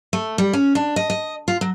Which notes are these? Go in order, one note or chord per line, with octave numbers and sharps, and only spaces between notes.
A3
G3
C#4
D4
D#5
D#5
F4
F#3